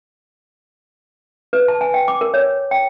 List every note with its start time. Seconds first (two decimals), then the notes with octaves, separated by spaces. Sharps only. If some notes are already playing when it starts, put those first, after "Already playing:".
1.53 B4
1.68 A5
1.81 G#5
1.94 G5
2.08 D6
2.21 A#4
2.34 C#5
2.71 G5